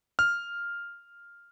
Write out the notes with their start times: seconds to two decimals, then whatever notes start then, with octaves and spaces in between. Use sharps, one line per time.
0.19 F6